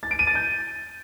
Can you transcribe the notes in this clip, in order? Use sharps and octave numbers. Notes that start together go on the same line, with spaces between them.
A6
D7
D#7
A6
G6